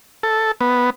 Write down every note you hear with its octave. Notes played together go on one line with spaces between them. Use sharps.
A4
B3